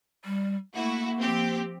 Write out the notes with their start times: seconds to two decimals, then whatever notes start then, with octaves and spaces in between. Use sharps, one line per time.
0.25 G3
0.75 A3 A#3 E4 F#4
1.20 F3 C4 G4